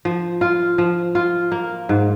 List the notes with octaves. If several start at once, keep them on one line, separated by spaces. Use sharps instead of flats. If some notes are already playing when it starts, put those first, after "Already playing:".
F3
F4
F3
F4
A#3
G#2